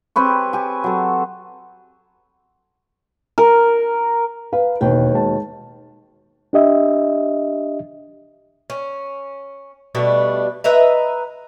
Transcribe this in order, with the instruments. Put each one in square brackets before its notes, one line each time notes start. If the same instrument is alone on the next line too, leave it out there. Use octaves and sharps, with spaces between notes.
[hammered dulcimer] C4 G4 B4 C#5
G4 G#5
F#3 A4
A#4
[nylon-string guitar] B4 [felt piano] F5
[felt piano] E1 [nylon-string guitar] D#2 B2 G5
[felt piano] G#3 A5
[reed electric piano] D4 G4 D#5 E5
[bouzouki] C#4
B2 G3 A3 D4
B4 D#5 E5 A#5